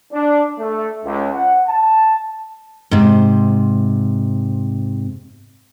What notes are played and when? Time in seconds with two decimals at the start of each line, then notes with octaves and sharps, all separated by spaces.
0.12 D4
0.59 A3
1.04 C#2
1.33 F#5
1.67 A5
2.91 G#2 C3